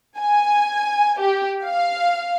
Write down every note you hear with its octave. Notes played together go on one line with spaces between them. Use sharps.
G#5
G4
F5